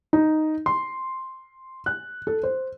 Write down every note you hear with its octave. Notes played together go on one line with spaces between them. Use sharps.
D#4
C6
F#6
A4
C5